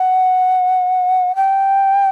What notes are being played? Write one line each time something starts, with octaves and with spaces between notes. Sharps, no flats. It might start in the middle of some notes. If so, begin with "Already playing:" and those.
Already playing: F#5
G5